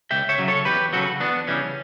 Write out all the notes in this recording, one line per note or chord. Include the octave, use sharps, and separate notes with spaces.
C#2 E5 G5
C#5 E5
C#3 F#3
A4 C#5
E2 G4 B4
C#3 F#3 F#4 A4
E2 B3 D4
C#3 E3 G3 C#4